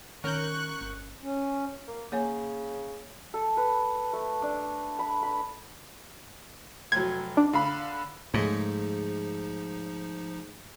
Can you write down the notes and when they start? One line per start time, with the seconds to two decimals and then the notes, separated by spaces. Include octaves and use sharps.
0.24 D#3 C#4 A#4 C#6 F#6 G6
0.81 G1
1.23 C#4
1.88 A#3
2.12 C#3 A#3 C#5 G#5
3.34 A4
3.57 B4
4.13 A3
4.42 D4
4.99 B5
5.23 B5
6.92 F1 F#3 G#6
7.37 D4
7.53 D3 F5 B5
8.34 G#2 C#3 F3 G#3 A3 D#4